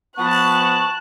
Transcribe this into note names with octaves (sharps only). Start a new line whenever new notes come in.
F3 B3 A5 C#6 F#6